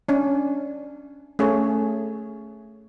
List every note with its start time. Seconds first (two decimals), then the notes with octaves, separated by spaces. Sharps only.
0.08 C#4 D4
1.39 A3 C#4 G#4 C#5